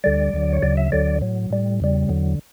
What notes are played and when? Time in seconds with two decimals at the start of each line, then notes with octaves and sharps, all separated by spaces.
0.04 D2 D3 G3 D5
0.33 D2 D3 F#3
0.53 C#5
0.63 D2 C#3 F#3 D5
0.77 E5
0.92 D2 D3 F#3 D5
1.21 A2 F#3
1.50 A2 G3
1.80 E2 C#3 G3
2.09 E2 D3 F#3